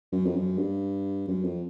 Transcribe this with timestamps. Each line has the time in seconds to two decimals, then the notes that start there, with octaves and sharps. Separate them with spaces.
0.12 F#2
0.26 F2
0.36 F#2
0.58 G2
1.28 F#2
1.44 F2